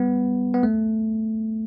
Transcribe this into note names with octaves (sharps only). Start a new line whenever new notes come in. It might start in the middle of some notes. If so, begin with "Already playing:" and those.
Already playing: G3 B3
B3
A3